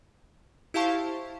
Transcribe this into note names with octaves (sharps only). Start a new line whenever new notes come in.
E4 G4 C5 F5 A5 C#6